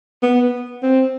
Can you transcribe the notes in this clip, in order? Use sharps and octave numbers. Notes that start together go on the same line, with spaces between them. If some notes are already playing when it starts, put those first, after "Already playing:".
B3
C4